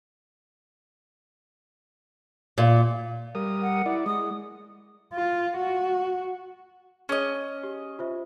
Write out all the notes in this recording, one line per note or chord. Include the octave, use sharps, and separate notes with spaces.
A#2
G3 A#4 D#6
F#5
E4 D5
G#3 D#6
F4
F#4
C#4 G#4 C#5 D#5
G4
F4 C5 E5